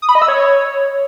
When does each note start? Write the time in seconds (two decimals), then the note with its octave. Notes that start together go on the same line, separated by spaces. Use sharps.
0.02 D#6
0.09 B5
0.15 D#5
0.22 E6
0.28 C#5